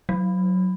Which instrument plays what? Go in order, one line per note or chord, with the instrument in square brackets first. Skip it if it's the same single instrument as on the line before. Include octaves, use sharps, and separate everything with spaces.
[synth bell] F#3